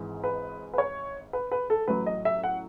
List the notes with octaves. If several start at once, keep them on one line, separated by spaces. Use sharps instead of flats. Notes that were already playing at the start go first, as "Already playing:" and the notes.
Already playing: G#1 G#2 E3 G#3
B4
B4
C#5
B4
B4
A4
A1 A2 F#3 B4
D#5
E5
F#5